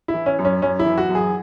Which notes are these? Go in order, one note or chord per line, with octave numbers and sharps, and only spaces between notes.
E4
E3
C#4
F#2
C#4
F#2 C#4
E4
E3
F#4
F#2
G#4